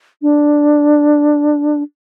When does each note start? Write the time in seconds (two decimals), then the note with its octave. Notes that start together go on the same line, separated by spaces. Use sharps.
0.22 D4